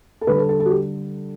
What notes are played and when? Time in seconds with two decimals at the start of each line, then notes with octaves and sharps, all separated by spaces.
0.21 A4
0.27 D3 G3 B4
0.38 A4
0.49 A4
0.60 A4
0.66 F#4
0.70 G4